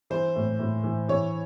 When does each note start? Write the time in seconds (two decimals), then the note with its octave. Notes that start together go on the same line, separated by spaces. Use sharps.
0.10 E3 C5
0.36 A2
0.59 A2
0.84 E3
1.08 E3 C#5